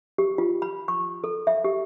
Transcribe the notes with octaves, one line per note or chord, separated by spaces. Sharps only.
G4
F4
B5
C#6
A4
E5
G4